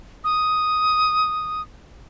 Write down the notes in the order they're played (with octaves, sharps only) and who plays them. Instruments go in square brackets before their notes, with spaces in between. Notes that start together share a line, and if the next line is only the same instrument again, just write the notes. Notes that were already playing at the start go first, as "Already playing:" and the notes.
[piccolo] D#6